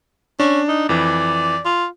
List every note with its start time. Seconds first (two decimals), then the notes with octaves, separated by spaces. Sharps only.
0.40 C#4 D4
0.68 D#4
0.89 F2 E3 D5
1.65 F4